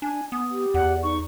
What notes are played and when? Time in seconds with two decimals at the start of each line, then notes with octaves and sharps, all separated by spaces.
0.02 D4 G#5
0.32 B3 D#6
0.51 G4
0.74 E2 D5 F#5
1.03 D#4 C#6